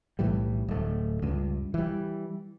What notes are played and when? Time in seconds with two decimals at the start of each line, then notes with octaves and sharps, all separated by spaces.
0.19 B1 A2 E3 G3
0.68 D1 A3
1.22 C#2 G2
1.74 E3 G3